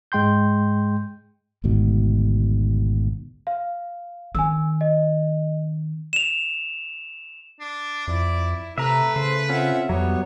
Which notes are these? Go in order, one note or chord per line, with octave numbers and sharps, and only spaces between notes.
G#2 G#3 G5 C6 G6
G#1 D2 G#2 B2
F5
D#3 C4 G#5 E6
D#5
E7 F7
D4
F2 E4 D5
C3 A3 B4 E5 A#5
C#3 C5
C4 C#4 F4 E5 F#5
F2 F#3 G3 B3 C#5